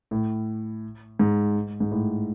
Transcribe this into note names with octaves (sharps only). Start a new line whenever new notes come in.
A2
G#2
G#2
A2